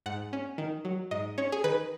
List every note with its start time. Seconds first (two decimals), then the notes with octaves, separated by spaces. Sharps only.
0.06 G#2 F#5
0.33 C#4
0.58 D#3
0.85 F#3
1.11 G#2 D#5
1.38 C#4 C#5
1.52 G#4
1.64 D#3 B4